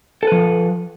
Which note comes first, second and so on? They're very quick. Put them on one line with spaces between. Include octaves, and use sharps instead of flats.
A4 B4 F3